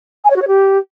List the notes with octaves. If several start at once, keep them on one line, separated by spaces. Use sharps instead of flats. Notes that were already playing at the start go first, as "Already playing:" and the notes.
G#5
C#5
F#4
C#5
G4